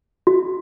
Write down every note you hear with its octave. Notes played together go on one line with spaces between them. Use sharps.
F#4